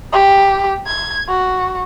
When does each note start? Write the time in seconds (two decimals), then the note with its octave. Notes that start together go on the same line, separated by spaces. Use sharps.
0.13 G4
0.86 G#6
1.29 F#4